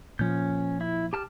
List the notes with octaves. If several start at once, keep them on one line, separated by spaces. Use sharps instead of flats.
A#2 F3 C#4 G6
E4
G4 A5 F6